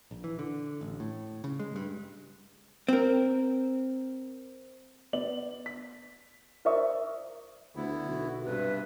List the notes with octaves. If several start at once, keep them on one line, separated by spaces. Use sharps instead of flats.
A#1
E3
D3
A1
A2
C#3
G#3
G2
C4 A#4
B3 D5 F#7
B6
A#4 C5 D5 E5 C#6 D#6
D2 D3 B3 E4
B1 F#4
G2 C3 B4